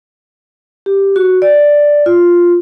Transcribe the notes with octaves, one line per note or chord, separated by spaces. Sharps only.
G4
F#4
D5
F4